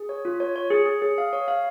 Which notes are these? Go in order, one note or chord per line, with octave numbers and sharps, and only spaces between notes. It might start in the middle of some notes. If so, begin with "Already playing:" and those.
Already playing: G#4
C#5
F4
C#5
C#5
G#4
G#4
G#4
F5
C#5
F5